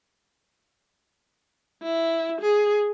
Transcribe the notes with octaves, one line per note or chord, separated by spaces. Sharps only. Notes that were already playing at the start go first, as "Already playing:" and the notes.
E4
G#4